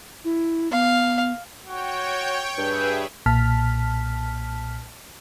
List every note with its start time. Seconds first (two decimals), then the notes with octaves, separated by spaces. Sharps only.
0.24 E4
0.72 B3 F5
1.65 F#4 C#5 G5
2.58 G2 G#4 B4 E5 G5
3.26 B1 A#2 A5 F6 B6